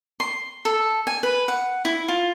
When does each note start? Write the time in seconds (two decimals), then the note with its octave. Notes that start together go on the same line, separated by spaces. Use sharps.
0.20 C6
0.65 A4
1.07 G#5
1.23 B4
1.48 F#5
1.85 E4
2.08 F4